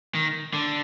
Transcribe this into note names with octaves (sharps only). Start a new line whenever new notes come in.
D#3
D3